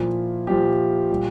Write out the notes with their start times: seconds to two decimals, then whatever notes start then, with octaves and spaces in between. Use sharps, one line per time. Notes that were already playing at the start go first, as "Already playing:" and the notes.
Already playing: A#2 F3 E4
0.47 A#2 F3 G4
1.10 A#2 G3